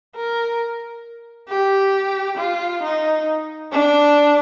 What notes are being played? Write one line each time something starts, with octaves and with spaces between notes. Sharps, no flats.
A#4
G4
F4
D#4
D4